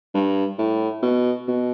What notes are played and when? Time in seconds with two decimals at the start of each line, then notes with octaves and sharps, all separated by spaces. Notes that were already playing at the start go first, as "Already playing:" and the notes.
0.14 G2
0.58 A2
1.02 B2
1.48 B2